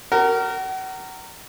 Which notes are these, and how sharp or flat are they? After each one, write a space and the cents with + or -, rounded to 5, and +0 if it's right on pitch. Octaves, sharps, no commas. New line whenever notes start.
F#4 +35 A#4 -15